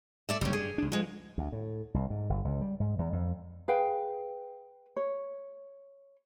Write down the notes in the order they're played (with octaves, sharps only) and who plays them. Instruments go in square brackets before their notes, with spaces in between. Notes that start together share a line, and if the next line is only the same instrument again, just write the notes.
[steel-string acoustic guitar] A3 D5 E5
[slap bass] F#1 D2 [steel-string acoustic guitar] G3 C#4
[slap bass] G2 [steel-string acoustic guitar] G#4
[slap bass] C#2 D4
[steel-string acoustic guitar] D2 G#3 [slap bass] F3
[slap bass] D2
A2
C2
G#2
G1
C#2
G3
G#2
E2
F2
[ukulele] G#4 B4 F5 G5
C#5